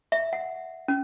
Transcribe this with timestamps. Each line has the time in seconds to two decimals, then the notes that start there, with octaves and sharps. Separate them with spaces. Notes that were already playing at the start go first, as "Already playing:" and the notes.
0.12 E5
0.33 F#5
0.88 C#4